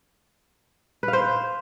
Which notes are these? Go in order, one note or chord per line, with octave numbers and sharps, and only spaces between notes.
B4
F5
C5